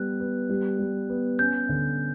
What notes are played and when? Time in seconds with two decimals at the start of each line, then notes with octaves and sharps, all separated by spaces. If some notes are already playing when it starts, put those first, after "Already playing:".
Already playing: G3 B3 F#6
0.20 B3
0.49 G3
0.79 G3
1.09 B3
1.39 C#4 G6
1.69 D3